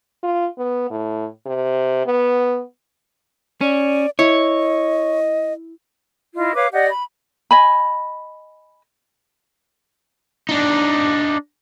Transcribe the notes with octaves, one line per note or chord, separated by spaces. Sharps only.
F4
B3
A2
C3
B3
C#4 D5
E4 C#5 D#5
E4 F4 D#5
B4 C#5 F5 D6
G4 D5 D#5 F#5
B5
D#5 G#5 B5
D4 D#4